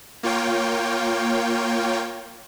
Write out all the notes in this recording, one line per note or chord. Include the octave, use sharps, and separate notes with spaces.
A#3 F4 C#5 G5